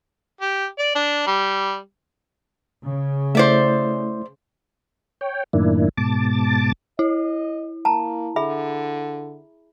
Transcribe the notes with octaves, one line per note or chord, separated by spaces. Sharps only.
G4
D5
D4
G3
C#3
A3 E4 C5 D5 E5
C#5 G5
F#2 A2 D#3 A#3 D4 E4
G#2 B2 A5 D6 A6
E4 D#5
A#3 A5 A#5
D3 G#4 E5 B5